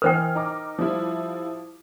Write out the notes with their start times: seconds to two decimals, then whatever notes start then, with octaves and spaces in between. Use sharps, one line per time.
0.02 E3 A#4 C5 G5 F6
0.35 D#4 A#5 D6
0.79 F3 G3 E4